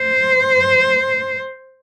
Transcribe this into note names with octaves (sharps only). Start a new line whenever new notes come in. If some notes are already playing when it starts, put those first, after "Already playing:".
Already playing: C5